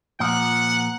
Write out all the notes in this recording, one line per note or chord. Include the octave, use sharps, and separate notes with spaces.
A#2 F3 F#5